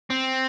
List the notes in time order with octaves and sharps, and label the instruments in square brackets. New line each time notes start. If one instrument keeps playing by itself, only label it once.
[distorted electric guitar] C4